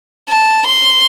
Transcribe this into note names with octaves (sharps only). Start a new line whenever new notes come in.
A5
C6